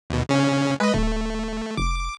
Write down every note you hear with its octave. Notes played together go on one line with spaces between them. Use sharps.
D#2 B2
C#3 C#4
G#3 B4 D#5
D1 A3
F1 D6